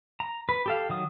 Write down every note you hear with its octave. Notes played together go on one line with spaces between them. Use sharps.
A#5
B4
G4 A4 F5
D#3 F#3 D#6